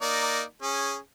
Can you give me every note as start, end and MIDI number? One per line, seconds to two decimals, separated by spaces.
0.02 0.42 58
0.02 0.42 63
0.02 0.42 74
0.62 0.97 61
0.62 0.97 68